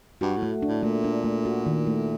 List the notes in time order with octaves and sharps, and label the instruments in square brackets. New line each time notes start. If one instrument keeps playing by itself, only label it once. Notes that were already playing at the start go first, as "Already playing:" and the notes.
[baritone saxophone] G2 [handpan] F#4
[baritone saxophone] A2
[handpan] A3
D4
[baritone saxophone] A2
[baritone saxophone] A#2 [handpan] A3
[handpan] D4
A3
F#4
D#3
A3